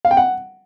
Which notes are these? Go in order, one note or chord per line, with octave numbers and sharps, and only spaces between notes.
F5
G5
F#5